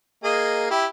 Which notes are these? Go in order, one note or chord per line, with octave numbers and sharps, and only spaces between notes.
A#3 G#4 D#5
E4 G4